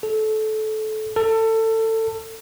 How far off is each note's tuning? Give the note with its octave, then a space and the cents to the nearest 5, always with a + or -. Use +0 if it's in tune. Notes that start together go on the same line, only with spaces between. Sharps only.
A4 -20
A4 +25